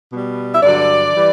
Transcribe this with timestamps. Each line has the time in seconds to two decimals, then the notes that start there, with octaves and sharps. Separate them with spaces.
0.11 B2 G3
0.55 E5
0.61 G2 D3 F#3 D5
1.13 E3 G3